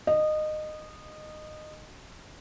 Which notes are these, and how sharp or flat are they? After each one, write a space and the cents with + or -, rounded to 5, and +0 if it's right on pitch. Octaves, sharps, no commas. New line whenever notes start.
D#5 -20